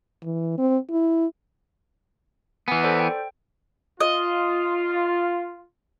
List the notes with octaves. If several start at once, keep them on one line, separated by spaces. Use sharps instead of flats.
E3
C4
E4
E3 B3 G#5
A4 C5 D5
G5
F4 D#5